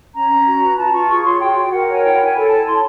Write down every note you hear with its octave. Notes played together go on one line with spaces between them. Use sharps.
C#4 A#5
C#4
F#4
B4
F4 A5
F4 C#6
G#4 C#6
C#5 C6
F#4 G5
F#4
A#4 F#5
C#5 G#5
E4 G5
E4 G#5
A4
C#5 A5
E4 C6